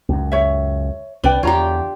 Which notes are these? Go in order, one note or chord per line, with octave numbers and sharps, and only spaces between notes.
C#2 F#2
C#5 E5
C2 D4 B4 D5 G5
E2 D3 F4 G4 C#5 A#5